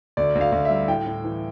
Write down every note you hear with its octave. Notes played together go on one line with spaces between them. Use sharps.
D2 D5
D2
F5
D2
E5
G3
A2 G5
A2
E3